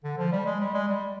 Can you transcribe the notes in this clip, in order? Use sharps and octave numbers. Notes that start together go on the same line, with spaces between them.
D3
F3
G3
G#3
G3
G#3
G3